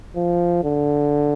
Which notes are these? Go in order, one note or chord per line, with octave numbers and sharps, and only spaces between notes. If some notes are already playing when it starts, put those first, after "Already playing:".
F3
D3